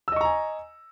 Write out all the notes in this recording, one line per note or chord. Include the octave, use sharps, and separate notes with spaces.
D#5 G#5 A#5 C#6 E6